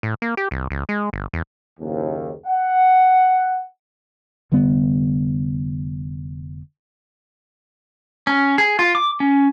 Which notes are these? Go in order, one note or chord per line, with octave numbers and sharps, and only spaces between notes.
A2
A#3
G4
C2
C#2
G#3
G1
E2
F#1 D#2
F#5
F1 D3 G3 B3
C#4
G#4
F4
D6
C#4